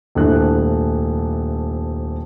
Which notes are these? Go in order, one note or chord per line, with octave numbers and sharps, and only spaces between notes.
D#1 C2 A3 D4 F#6